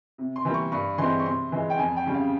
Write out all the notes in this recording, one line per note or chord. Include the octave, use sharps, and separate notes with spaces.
C3
C6
E3 G3 A#3
C#6
G2 C#6
E3 G#3 C4 C6
C#6
C3 C6
E3 G#3
G5
F2 G#5
G5
C#3 G3 C#4
F5